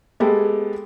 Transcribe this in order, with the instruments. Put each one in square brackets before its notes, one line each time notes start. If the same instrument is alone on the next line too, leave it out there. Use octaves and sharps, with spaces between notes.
[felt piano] G#3 B3 G4 A4